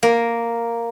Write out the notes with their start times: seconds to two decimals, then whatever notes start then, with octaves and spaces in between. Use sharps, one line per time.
0.03 A#3